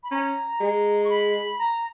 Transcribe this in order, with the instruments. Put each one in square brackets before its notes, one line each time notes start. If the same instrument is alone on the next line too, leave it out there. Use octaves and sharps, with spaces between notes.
[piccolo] B5
[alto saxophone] C#4 [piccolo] A#5
[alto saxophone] G#3
[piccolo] C#6
B5
A#5